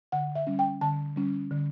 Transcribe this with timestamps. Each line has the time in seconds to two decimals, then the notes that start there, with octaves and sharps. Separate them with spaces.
0.12 D3 F#5
0.35 E5
0.47 G3 C#4
0.59 G5
0.81 D3 A5
1.16 G3 C#4
1.51 D3